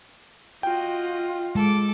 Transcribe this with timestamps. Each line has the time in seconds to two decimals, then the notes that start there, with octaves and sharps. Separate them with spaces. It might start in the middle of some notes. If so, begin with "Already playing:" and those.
0.63 F4 F#4 D#5 G5
1.55 G#3 A4 D6